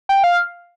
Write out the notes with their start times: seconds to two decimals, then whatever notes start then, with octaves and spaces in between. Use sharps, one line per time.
0.09 G5
0.24 F5